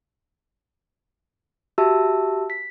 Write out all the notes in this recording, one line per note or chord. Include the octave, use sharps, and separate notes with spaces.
F#4 G4 E5 A5 E6
B6